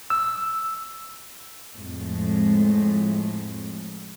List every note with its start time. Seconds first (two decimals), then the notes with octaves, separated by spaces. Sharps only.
0.10 E6
1.76 F2 A2 G#3